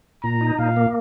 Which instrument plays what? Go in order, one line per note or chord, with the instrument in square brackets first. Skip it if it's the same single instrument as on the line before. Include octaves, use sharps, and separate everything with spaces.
[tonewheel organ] A#2 [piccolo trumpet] A#5
[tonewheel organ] D#4
[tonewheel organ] A#2 [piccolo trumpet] F5
[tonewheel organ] A#3